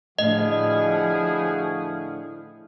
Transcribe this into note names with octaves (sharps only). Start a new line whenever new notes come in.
A2 D3 F3 E4 F#4 G#4 D#5